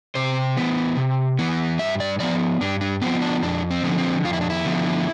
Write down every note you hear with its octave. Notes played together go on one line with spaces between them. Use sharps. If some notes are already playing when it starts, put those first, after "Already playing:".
C3 C5
E3 B3
C3
E3 B3
G2 E5
D5
F3 B3 D5
G2 D4
D4
F3 B3 C4
D4
F2 D4
C4
D3 F3 B3
C4
F2 F4
E4
D4
E4
D3 F3 B3